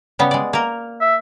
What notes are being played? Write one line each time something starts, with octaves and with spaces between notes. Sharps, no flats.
C#3 G3 B3
G#3 D5
A#3 A#4
E5